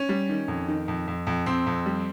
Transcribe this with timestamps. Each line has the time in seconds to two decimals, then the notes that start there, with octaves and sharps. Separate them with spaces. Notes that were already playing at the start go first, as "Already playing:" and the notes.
Already playing: C#4
0.09 G3
0.29 D#3
0.48 F2
0.68 D#3
0.88 F2
1.07 F2
1.27 F2
1.46 F2 C4
1.67 F2
1.86 G3